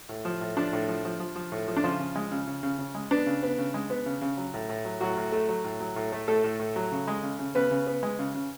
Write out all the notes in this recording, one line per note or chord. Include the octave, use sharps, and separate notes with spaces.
A2
F3
A2
F3 D4
A2
F3
F3
F3
F3
A2
F3
D4
C#3 F3 F4
C#3
G#3
C#3
C#3
C#3
C#3
G#3
B3 D4
C#3
B3
C#3
G#3
B3
C#3
C#3
F#3
A2
A2
F#3
A2 F#3 F#4
A2
A3
F#3
A2
F#3
A2
A3
A2 A3 A4
A2
A2
F#3
C#3
G#3
C#3
C#3
C#3 B3 B4
C#3
B3
G#3
C#3
C#3